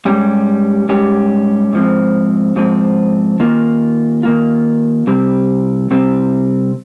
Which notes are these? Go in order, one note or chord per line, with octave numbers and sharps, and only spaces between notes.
G#2 G3 C#4 G4
G#2 G3 C#4 G4
G#2 F3 C4
G#2 F3 C4
D#3 A#3 F4
D#3 A#3 F4
C3 G3 C4
C3 G3 C4